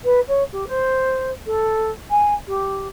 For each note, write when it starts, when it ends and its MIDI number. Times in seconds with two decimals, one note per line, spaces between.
0.04 0.20 71
0.27 0.42 73
0.52 0.64 67
0.66 1.29 72
1.46 1.90 69
2.10 2.33 80
2.47 2.87 67